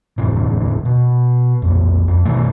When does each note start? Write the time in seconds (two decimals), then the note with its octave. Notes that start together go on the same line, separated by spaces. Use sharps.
0.18 E1 D2 A2 C3
0.85 B2
1.62 B1 F2
2.08 F2
2.25 B2 D#3 A3